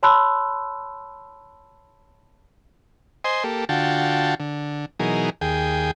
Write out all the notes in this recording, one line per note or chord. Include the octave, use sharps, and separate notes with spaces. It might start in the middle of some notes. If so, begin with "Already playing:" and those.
C#5 A5 B5 C6 E6 F#6
C5 D#5 G#5 C6
A#3 G4 A4
D3 F4 F#4 G5 A5
D3
B2 E3 F#3 D#4 G#4 A#4
D#2 G#4 G5